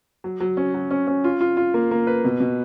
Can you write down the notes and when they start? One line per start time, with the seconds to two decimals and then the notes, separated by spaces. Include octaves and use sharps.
0.24 F#3
0.40 F#3
0.57 C#4
0.74 F#3
0.91 C#4
1.07 C#4
1.24 F4
1.41 F4
1.57 F4
1.74 A#3
1.91 A#3
2.07 B4
2.25 B2
2.40 B2